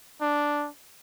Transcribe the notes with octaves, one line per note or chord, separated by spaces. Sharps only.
D4